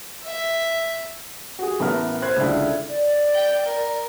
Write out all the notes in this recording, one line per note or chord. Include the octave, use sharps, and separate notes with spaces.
E5
F#4 G#4
A1 B3 A#4 E5 A5 F6
C5 B5 F#6 G#6
C#2 D3 E4 E5 A5
D5
G5
A#4